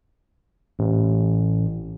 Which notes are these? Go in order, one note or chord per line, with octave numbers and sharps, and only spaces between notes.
A1